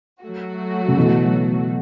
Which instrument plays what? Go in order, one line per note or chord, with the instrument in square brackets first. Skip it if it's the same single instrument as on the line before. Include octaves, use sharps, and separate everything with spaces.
[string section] F#3 A3 F#4
[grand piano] C#3
B2 E3